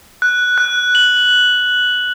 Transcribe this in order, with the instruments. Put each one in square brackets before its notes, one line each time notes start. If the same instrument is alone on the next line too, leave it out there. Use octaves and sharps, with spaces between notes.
[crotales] F#6
F#6
F#7